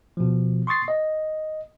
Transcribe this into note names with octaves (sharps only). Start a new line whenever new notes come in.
B2 F3
C6 C#6 D#6 A6 C7
D#5